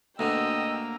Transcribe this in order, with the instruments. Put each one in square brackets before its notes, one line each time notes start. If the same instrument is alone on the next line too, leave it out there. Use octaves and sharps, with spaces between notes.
[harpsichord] D2 B2 D3 [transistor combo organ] A#3 [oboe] D#5 [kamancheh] G5 E6